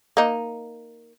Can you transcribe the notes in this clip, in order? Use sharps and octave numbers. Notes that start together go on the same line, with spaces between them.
A#3 D#4